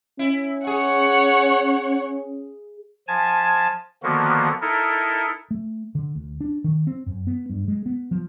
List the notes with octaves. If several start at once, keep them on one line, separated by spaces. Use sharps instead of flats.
C#4 E4
G#4 C#5 F#5
F3 G#5 A5 G#6
D3 D#3 F3 A#3 B3 F#4
D#4 E4 A4 A#4
A3
D3
D2
D4
D#3
C4
F#2
B3
G2
G#3
B3
F3